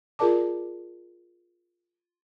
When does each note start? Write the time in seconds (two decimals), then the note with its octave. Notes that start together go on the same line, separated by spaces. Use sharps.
0.19 F4 G#4 A#4 D5 A5 D6